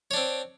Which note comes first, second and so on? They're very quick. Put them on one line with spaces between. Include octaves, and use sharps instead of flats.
C#5 D4 C4